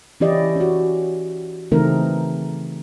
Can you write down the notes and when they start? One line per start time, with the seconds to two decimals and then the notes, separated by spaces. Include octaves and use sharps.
0.20 E3 C#4 E4 G4 D5 D#5
0.56 C#4 F#4
1.71 C#3 E3 A3 C4 D#4 A#4